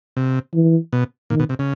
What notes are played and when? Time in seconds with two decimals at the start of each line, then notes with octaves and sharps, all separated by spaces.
0.17 C3
0.54 E3
0.93 B2
1.30 A#2 D#3
1.39 B2
1.49 C3
1.59 C#3